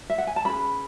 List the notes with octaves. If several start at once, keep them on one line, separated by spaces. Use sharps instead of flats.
E5
F#5
G#5
A5
C#4 G#4 B4 B5